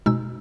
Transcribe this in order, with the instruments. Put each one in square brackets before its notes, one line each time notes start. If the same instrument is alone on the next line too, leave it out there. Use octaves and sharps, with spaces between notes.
[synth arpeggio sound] B2 G#3 D#4 E6